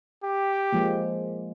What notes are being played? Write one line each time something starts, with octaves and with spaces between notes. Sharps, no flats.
G4
F3 G#3 A#3